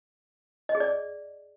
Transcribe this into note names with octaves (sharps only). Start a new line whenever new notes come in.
D#5
G#4
D5